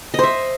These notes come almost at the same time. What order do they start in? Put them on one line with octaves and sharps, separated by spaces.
D#5 C5 E5